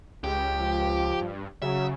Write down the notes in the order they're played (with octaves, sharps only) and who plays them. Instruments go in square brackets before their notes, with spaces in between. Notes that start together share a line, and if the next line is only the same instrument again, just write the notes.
[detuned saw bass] C#2 [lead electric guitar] G4
[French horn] F3
[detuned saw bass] G2
[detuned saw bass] C#3 [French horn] F#3 [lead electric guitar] E5